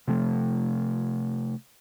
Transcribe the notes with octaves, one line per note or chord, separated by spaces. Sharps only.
C3 F3 A3